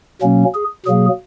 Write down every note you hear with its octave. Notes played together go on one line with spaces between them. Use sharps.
B2 F#3 A#3 C#4
G#4
B2 F#3 A#3 G#4